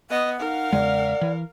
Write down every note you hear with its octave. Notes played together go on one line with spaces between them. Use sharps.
B3 D#5 F#5
D#4 A#4 F5
E2 C#3 G#3 D5
E3